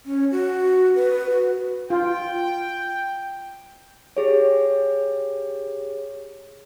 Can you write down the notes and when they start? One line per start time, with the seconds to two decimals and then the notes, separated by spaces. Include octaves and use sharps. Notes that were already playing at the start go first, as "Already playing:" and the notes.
0.06 C#4
0.31 F#4
0.95 B4
1.30 F#4
1.90 F4 G5
4.17 G4 G#4 C#5